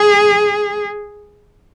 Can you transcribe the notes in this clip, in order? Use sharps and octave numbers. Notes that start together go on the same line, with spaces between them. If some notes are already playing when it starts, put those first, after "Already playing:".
Already playing: G#4